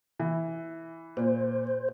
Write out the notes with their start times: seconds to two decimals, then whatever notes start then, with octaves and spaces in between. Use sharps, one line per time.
0.19 E3
1.17 A#2 C5